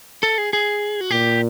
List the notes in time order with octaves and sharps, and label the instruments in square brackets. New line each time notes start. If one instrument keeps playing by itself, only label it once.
[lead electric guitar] A4
G#4
G#4
F#4
[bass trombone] A#2 [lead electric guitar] G4